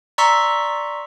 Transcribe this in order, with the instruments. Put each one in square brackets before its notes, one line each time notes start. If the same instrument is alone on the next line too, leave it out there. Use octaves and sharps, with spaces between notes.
[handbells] D5 A#5 C6 C#6 E6 B6